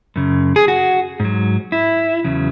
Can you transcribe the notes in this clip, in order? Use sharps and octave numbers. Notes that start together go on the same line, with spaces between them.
F#2 C#3
G#4
F#4
G#2 F#3
E4
E2 C#3 F#3